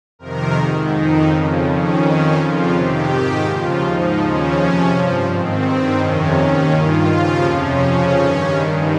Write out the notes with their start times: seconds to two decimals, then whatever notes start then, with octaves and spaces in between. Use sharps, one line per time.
0.19 F2 C3 D#3 A#4
0.55 G#2 D#3
0.91 F2 D#3 D#4
1.27 F2 C#3 F3
1.64 F2 D#3 C#4
2.00 F2 D#3 C#4
2.36 F2 C#3 F3 F4
2.72 F2 C3 D#3 G4
3.09 G#2 D#3
3.45 D#2 C#3 F3 F4
3.81 G#2 F3 D#4
4.17 D#2 C#3 F3 C#4
4.54 F2 C3 F3
4.90 G2 F3
5.26 G#2 D#3 C4
5.62 G2 D#3
5.98 F2 C3 D#3 C#4
6.35 D#2 D#3 C#4
6.71 G2 D#3 F4
7.07 D#2 C#3 F3
7.43 F2 C3 F3 C#4
7.80 F2 C#3 F3 C#4
8.16 G2 D#3
8.52 G2 D#3